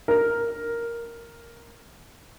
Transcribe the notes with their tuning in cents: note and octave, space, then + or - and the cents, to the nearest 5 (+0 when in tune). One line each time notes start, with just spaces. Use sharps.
A#4 +0